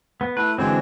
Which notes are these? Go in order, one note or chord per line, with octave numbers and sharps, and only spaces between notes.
B3
A3 E4 B4
D3 E3 G#3 C4 F#4 C#5